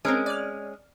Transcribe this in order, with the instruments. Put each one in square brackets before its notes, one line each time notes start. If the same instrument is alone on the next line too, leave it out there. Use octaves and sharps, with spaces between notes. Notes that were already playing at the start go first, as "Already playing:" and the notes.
[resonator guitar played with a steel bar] G#3 C#4 [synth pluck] C4 A#4 D7
[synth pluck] D5 F6